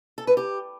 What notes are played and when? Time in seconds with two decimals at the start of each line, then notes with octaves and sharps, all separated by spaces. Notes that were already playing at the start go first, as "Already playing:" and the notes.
0.18 A4
0.27 B4
0.37 G4